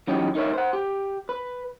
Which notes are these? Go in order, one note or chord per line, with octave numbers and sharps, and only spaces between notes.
E3 F#3 C#4 D#4 G4
D#4 A#4 C#5 E5
C5 F#5
G4
B4